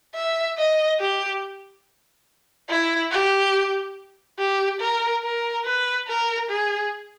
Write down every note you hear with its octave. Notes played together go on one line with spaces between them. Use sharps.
E5
D#5
G4
E4
G4
G4
A#4
A#4
B4
A#4
G#4